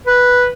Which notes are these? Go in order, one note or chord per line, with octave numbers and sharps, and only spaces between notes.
B4